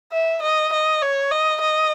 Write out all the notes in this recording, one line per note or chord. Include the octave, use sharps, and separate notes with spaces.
E5
D#5
D#5
C#5
D#5
D#5